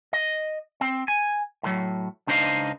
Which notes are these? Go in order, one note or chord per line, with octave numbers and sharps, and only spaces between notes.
D#5
C4
G#5
A2 D#3 F#3
C#2 D4 D#4 C5 D#5 F5